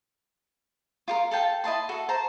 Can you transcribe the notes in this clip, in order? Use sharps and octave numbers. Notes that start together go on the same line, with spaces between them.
F4 G4 A#4
A4 F5 G5 A5
E4 D#5 A5 C6
F#4 A4
C5 A5 A#5